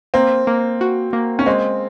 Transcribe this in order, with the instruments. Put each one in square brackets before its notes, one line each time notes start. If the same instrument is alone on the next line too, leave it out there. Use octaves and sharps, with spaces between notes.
[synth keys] A#3 [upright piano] C4
[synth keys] A#3
F#4
A#3
[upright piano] C#4
[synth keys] G#3 [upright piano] C4